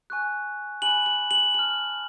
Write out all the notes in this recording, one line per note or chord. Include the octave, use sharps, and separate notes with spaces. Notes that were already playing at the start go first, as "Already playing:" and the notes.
G#5 C#6 F#6
G#5 B5 F#6 F#7
F#7
F#7
A5 F6 F#7